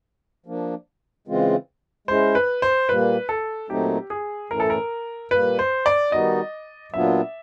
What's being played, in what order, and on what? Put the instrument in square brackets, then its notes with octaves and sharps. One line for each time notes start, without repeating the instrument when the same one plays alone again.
[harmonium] F3 A#3 D4
C#3 E3 G#3 C4 F4
[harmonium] G#3 C#4 E4 [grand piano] C5
[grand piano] B4
C5
[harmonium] A#2 G3 A#3 [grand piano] B4
[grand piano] A4
[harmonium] A#2 F#3 A3 C4 D#4 [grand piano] G4
[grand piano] G#4
[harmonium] A2 E3 A3 C#4 E4 [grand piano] A#4
[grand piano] A4
A#4
[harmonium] A#2 G3 A#3 [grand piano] B4
[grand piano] C5
D5
[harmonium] D#3 G3 B3 D#4 F#4 [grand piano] D#5
[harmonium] A#2 F#3 B3 D4 F4 [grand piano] E5